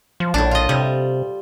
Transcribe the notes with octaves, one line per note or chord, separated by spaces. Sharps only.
F3
A#1 A2 D4
F4 D#5
C3 G3